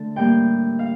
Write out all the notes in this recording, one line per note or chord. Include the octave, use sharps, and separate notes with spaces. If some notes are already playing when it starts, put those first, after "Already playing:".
Already playing: D3 A3 A5
A2 G3 A#3 G5
F5